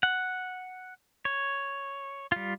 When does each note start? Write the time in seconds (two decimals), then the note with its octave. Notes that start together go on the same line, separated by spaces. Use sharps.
0.03 F#5
1.25 C#5
2.32 G3 F4